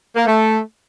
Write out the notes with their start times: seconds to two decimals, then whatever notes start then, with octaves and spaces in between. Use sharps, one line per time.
0.16 A#3
0.27 A3